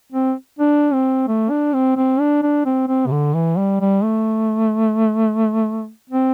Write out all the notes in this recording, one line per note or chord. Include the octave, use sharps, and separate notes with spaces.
C4
D4
C4
A3
D4
C4
C4
D4
D4
C4
C4
C3
D3
E3
G3
G3
A3
C4